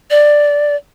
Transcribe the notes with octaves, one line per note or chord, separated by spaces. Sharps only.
D5